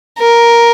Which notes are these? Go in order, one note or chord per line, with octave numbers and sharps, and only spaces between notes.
A#4